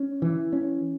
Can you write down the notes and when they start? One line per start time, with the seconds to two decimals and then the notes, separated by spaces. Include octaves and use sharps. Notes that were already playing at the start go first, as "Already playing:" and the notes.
Already playing: C#4
0.22 E3
0.53 C#4